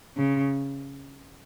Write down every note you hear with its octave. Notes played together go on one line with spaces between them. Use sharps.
C#3